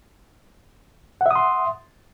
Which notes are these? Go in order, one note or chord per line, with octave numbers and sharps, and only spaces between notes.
E5 F#5 C6 D#6